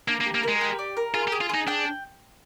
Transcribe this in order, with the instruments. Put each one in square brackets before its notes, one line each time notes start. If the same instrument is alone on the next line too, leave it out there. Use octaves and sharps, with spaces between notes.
[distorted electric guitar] A#3 [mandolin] D4
[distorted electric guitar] A#3
[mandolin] G4
[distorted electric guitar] A#3
[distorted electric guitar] G#3 [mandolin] A#4
[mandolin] G4
D5
A#4
[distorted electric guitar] F4 [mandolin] G#4
[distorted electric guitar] G4
[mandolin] G#4
[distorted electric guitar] F4
[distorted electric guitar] D#4 [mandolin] G#4
[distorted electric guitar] D4 [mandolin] G5